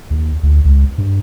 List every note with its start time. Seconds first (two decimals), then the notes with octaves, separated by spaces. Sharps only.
0.11 D#2
0.43 D2
0.65 C#2
0.98 G2